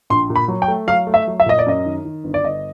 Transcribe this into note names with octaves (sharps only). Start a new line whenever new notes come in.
A#1 C6
A#2
B5
F#3
G5
A3
F#3 F5
A3
E5
F#3
E5
A#2 D#5
D5
F#2 D#5
D#3
D#3
G1
D5
G1 D#5